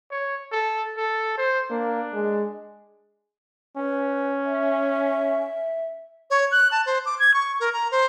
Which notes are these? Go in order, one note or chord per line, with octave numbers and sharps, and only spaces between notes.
C#5
A4
A4
C5
A#3 D4
G#3
C#4 B4
E5
C#5
F#6
A5
C5
D6
G#6
C#6
A#4
A#5
C5